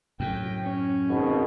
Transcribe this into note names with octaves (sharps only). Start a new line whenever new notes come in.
F#2 A2 G5
C#4
G#1 B2